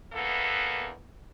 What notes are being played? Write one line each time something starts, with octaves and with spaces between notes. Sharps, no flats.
E2 E3 A#3 B3 A4